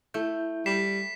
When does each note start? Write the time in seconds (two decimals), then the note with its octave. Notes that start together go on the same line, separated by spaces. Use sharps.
0.14 A3 E4 G6
0.66 G3 B6 C7 E7